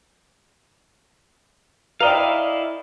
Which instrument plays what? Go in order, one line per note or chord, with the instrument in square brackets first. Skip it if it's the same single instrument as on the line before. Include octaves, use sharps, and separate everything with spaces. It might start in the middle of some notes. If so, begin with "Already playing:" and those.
[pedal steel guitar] E4 D#5 F5 [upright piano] A#4 D5 G5